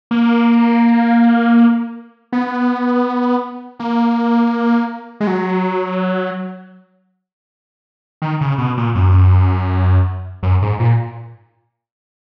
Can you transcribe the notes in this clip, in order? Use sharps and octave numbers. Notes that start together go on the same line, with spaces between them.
A#3
B3
A#3
G#3
F#3
D#3
C#3
B2
A#2
F#2
F#2
G#2
A#2